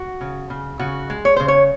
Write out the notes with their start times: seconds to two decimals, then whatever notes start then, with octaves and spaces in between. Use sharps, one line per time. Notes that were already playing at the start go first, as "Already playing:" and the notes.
Already playing: F#4
0.21 C#3
0.50 C#3
0.79 C#3 F#4
1.10 G#3
1.25 C#5
1.36 C#3 C5
1.48 C#5